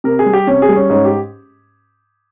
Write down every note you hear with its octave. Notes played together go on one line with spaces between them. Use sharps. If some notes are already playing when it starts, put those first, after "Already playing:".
C3 A#4
G#4
G3
G4
C3 C#4
G#4
G3
C#4
G#2 C#4
G4